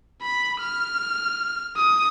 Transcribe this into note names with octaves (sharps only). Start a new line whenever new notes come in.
B5
F6
D#6